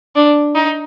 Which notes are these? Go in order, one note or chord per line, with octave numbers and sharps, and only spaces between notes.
D4
D#4